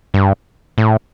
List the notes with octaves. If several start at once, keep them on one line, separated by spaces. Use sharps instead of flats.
G2
A2